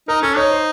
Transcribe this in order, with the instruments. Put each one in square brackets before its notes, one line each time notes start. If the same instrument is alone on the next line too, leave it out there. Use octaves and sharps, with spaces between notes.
[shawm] D#4 [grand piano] A#4
[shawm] C#4 [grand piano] A4
[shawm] D#4 [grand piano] C#5
[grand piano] C5